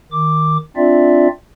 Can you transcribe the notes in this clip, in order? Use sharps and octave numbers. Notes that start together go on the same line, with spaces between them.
D#3 D6
C4 D4 F4 D5 E5